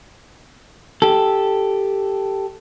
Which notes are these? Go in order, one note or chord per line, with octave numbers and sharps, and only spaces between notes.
G4 A4